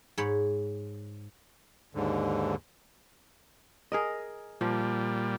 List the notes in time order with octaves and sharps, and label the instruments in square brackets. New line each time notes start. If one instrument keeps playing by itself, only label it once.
[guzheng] G#2 C#5 B5
[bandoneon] D#2 G#2 D3
[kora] G#4 A#4 D#5
[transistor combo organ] A#2 G3 [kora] F3